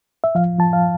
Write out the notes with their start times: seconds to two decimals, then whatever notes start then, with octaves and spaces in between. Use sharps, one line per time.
0.24 E5
0.35 F3 F5
0.59 F3 A5
0.73 F5